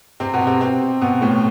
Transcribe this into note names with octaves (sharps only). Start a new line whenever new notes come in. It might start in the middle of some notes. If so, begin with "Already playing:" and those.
C3 C4
B2 B3
C3 C4
C3 C4
B2 B3
A2 A3